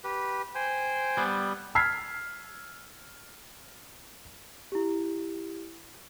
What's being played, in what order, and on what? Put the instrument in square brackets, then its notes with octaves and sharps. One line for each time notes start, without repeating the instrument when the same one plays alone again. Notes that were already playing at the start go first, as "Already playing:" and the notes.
[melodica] G4 B4
C5 G5 G#5
[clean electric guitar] G3 B3
[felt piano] E6 F6 G#6 B6 C7
[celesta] E4 G4